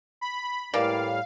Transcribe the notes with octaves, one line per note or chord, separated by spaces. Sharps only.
B5
A2 E3 G3 A#3 D5 F5